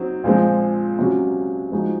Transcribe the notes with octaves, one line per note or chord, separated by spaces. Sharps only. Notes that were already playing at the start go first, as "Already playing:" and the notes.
Already playing: F#3 C4 D#4 F#4
A#2 F3 G#3 C4
C3 F#3 C#4 F#4
F3 G#3 D#4 F#4